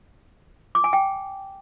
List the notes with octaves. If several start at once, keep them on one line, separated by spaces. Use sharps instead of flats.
D6
G#5
G5